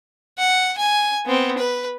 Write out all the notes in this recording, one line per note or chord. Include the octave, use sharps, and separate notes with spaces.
F#5
G#5
B3 C4
B4